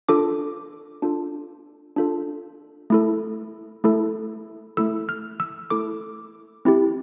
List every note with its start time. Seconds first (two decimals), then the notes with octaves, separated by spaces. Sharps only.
0.09 D4 F4 A4 D6
1.02 D4 F4 A4
1.96 D4 F4 A4
2.90 A3 E4 A4
3.84 A3 E4 A4
4.77 A3 E4 A4 E6
5.09 F6
5.40 E6
5.70 A3 E4 A4 D6
6.65 C4 E4 G4